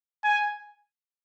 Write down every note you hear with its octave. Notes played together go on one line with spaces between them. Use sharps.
G#5